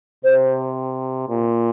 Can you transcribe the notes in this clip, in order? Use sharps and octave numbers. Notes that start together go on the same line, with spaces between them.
C3 C5
A#2